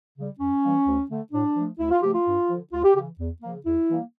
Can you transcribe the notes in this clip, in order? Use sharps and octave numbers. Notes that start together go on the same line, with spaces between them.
C#3 G3
F2 C#4
E3 G3 A#3
D2
D3 A3
A2 D4
F3 A3
D2 E4
F4
C#3 F3 A3 G4
F4
G2
D3 F3
D2 F4
G4
C#3 E3 G4
E2
C#3 F3 A#3
E2 E4
E3 G3 A#3